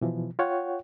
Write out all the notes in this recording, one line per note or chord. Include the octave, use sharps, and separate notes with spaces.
B2 E3 F3
F4 C#5 F#5 G5